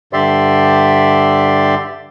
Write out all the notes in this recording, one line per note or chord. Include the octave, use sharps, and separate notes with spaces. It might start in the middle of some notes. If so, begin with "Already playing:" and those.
G2 D3 G4 D5 E5 C6